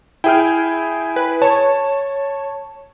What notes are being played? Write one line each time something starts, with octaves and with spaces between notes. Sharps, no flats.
E4 G#4 G5 F6
B4
C#5 A5